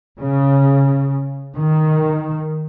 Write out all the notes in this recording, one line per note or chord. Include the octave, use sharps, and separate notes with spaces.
C#3
D#3